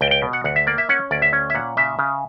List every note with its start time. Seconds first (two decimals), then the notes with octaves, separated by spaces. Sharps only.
0.01 C#2 G5
0.11 G5
0.22 B2
0.33 F#5
0.44 D2 F#5
0.56 E5
0.67 A#3 D5
0.78 E5
0.89 C#4 F#5
1.11 D2 D5
1.22 E5
1.33 C#4
1.50 E5
1.55 A#2 F#5
1.77 C#3 E5
1.99 C#3